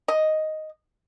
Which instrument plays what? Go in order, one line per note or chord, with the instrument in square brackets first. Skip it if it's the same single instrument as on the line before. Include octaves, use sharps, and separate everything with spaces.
[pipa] D#5